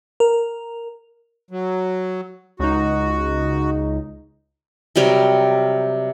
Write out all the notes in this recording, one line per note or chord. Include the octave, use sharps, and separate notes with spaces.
A#4
F#3
C#2 D#4 F#4
C3 F#3 G3 A#4